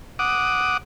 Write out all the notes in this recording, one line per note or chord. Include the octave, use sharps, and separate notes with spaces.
F#5 D6 D#6